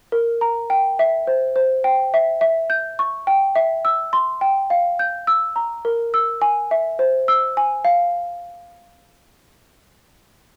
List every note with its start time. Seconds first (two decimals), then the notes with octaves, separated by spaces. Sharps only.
0.12 A#4
0.41 A#5
0.70 G5
0.99 E5
1.27 C5
1.56 C5
1.84 G5
2.14 E5
2.41 E5
2.70 G6
2.99 C#6
3.27 G5
3.56 E5
3.85 E6
4.13 C6
4.41 G5
4.70 F5
4.99 G6
5.27 E6
5.56 A#5
5.85 A#4
6.14 E6
6.42 G#5
6.71 E5
6.99 C5
7.28 E6
7.57 G#5
7.85 F5